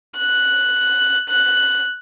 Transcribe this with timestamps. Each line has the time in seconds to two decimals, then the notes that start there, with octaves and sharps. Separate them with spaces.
0.18 F#6
1.29 F#6